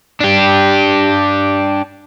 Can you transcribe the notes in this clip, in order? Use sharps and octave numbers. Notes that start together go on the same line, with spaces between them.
D4 G4